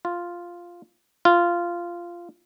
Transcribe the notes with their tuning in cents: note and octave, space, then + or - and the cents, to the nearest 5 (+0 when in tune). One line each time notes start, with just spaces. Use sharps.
F4 +0
F4 -10